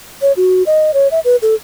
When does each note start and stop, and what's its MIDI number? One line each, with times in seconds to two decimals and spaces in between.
0.22 0.32 73
0.37 0.63 66
0.66 0.91 75
0.94 1.08 73
1.12 1.20 76
1.25 1.36 71
1.42 1.55 69